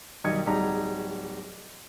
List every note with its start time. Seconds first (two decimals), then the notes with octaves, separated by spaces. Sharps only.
0.24 B1 D#3 G3 D#5 G#6 C#7
0.46 D1 G3 D#4 F#4 G#4 A#5